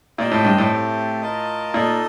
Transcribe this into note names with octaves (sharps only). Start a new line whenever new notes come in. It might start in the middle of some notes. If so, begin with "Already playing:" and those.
A#2 G4 C5 D#5 G5
A2
G2
A2
A3 C4 G4
F4 A#4 D#5 A5
A#2 D#4 A4 D#5